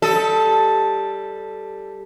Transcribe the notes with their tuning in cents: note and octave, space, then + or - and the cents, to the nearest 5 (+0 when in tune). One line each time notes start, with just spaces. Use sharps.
G3 +0 A4 +0 D#5 +40